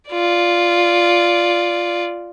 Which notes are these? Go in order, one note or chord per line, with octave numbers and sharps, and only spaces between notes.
F4 D5